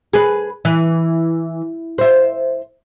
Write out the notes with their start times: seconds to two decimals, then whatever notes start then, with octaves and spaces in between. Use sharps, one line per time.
0.13 G#4 B4
0.65 E3
1.98 C5 E5